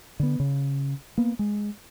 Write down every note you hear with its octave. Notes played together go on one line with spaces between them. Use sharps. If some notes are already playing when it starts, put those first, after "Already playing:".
D3 B3
C#3
A#3 B3
G#3